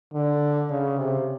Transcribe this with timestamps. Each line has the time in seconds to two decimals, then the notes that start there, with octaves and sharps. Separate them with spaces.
0.13 D3
0.70 C#3
0.98 C3